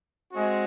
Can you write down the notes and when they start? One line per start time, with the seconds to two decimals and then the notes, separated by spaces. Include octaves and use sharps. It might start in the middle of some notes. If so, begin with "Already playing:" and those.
0.31 G#3 C4 F#4